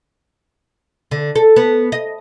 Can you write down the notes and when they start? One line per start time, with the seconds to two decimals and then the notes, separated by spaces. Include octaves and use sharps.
1.11 D3
1.36 A4
1.56 B3
1.92 D#5